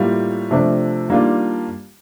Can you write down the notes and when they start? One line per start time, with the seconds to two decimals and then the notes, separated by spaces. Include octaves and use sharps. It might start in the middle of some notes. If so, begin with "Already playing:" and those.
Already playing: A2 G3 A#3 F4
0.51 C3 F3 A3 D4
1.09 D#3 G3 A#3 D4 F4